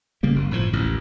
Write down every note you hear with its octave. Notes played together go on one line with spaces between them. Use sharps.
C#3 G3 A#3
F#1
G1 A2 F3
A1 D#2